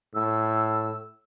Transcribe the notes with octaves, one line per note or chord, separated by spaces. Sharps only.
A2 E6